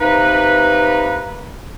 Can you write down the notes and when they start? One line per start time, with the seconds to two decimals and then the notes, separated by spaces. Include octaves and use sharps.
0.01 C3 A#3 D#4 B4